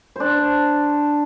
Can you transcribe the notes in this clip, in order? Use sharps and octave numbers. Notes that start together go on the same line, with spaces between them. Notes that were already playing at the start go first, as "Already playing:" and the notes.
D4 C5